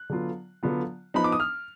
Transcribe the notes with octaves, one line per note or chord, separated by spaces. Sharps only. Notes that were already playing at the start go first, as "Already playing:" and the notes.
Already playing: F#6
D3 F#3 B3 F4
D3 F#3 B3 F4
F3 B3 D#4 B5
D6
D#6
F6